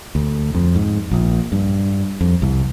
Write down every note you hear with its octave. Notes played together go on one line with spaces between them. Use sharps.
D2
F2
G#2
A#1
G2
F2
C2